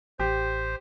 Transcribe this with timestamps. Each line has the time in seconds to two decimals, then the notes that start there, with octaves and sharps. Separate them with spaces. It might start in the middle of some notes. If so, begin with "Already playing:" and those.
0.20 A1 G4 C5